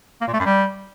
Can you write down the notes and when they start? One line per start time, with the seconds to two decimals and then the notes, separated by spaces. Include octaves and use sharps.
0.21 A#3
0.27 A#2
0.34 A3
0.40 F#2
0.46 G3